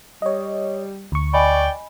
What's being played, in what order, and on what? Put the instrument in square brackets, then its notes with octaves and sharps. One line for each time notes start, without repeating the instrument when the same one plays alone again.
[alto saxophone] G3 [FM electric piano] C#5 D#5
[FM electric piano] D2 C#6
[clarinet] D5 [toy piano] D#5 G#5 B5 [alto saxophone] G5